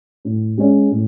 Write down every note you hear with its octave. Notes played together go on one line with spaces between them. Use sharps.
A2
G#3 C#4
A2